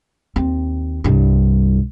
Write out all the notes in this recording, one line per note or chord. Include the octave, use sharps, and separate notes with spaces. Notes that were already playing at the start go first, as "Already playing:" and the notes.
D#2 C4
C2 G2